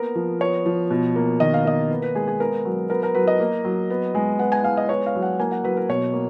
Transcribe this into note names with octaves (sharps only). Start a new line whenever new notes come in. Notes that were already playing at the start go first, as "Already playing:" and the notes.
Already playing: A#3 B3 A#4
F3
B3 C#5
F3
B2
A#3
D#3 D#5
F5
A#3 D#5
B3 B4
B4
G#3 G#4
G#4
B3 A#4
F#3
B3 A#4
A#4
F#3 B4
D#5
A#3
F#3
B3
G#3
B3 F#5
G#5
G#3 F5
D#5
B3 C#5
F5
F#3
F#5
A#3 G#5
F#5
F#3 B4
A#4
B2 C#5
A#3